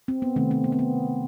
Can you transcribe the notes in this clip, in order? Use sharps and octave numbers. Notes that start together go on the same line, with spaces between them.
C4
B3
C3 D#3 A3 C4
C4
B3
C4
B3